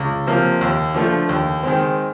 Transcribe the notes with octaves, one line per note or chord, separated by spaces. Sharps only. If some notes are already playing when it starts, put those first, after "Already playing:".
Already playing: C#2
C3 F3 A#3
D#2
D3 F3 A3
D#2
D#3 G#3 C4